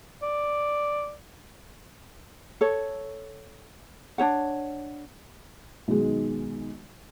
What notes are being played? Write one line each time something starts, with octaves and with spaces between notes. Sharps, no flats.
D5
A4 C#5
D4 D#4 C#5 F#5
B1 D#3 G#3